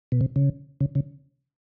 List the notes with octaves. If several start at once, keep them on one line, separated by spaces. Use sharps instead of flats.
B2
C3
C#3
C#3
C#3